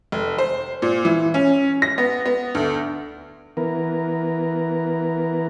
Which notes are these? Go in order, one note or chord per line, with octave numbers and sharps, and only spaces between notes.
F1
C5
A#2
E3
C#4
A#6
B3
B3
D2
E3 B3 A#4